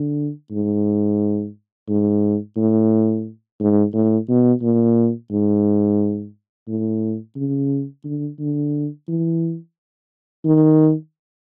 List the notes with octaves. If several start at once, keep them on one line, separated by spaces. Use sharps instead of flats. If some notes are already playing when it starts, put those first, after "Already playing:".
Already playing: D3
G#2
G#2
A2
G#2
A2
B2
A#2
G#2
A2
C#3
D3
D3
E3
D#3